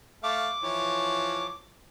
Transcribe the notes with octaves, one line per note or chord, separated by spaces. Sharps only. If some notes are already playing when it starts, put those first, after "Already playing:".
A3 F5 D6
E3 F3 C#5